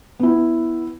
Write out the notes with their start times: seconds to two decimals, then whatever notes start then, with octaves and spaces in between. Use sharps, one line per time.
0.19 B3 E4